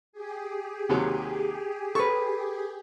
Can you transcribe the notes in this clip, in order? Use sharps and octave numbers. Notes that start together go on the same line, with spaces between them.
G4 G#4
D#2 C3 F#3
A4 B4 C#6